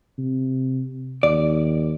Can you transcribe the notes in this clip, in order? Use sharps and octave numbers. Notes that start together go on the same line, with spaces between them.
C3
D#2 D5